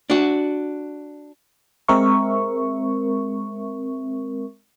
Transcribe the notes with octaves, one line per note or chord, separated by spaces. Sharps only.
D4 F#4
G#3 C4 A#4 E5 C#6